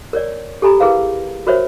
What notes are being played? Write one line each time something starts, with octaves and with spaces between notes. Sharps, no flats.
A#4 C#5 D5
G4 A4 G#5 A#5 B5
E4 G#4 A#4 B4 F5 F#5
F#4 A#4 C5 C#5 E5